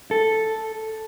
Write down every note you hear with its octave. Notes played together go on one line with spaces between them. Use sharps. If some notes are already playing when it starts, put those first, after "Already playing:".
A4